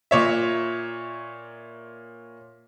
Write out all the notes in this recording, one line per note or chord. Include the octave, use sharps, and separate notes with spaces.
A#2 C#5 E5